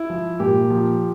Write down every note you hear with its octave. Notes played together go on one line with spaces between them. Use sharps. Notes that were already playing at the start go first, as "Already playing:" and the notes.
Already playing: E4
F3
A#2 G4
F3